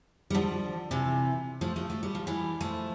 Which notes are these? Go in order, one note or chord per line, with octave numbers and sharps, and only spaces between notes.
G3
D3 F3
C3 E3
F3 A3
F3 A3
A3
G3
F3
E3 G3
F3 A3